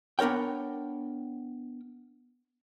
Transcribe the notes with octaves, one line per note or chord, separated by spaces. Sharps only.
B3 D4 A#4 C#5 G5